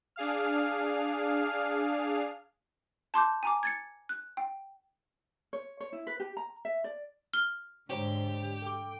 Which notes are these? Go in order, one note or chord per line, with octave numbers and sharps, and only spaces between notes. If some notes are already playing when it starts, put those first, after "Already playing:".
D4 G#4 F5 F6
A5 C6 D6 G6
G#5 A#5 D6
G#6 A6 C#7
F#6
G5
C#5
C#5
E4
B4
G4
A#5
E5
D5
F6 G7
G#2 D3 G4 C5 C#5 A#5
A4 G5 D6